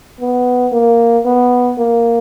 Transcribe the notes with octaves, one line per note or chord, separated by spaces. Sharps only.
B3
A#3
B3
A#3